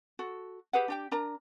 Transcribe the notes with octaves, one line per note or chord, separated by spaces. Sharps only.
F#4 A4
G4 G#4 B4 F#5
D4 G4 G5
D4 A#4 A#5